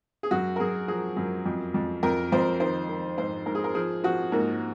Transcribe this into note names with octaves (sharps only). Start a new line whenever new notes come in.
G#4
F#2 F#4
A#4
F#2 G#4
F3 G#4
F#2
F2
F2
F2 A#4
F2 C5
D#3 C5
D#3
G#2 C5
G#2 A#4
G#4
A#4
F3 G#4
F3 F#4
G#2 A#3